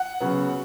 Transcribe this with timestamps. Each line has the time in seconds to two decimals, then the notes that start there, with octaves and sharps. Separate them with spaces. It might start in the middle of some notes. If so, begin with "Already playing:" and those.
Already playing: F#5
0.20 C#3 F#3 B3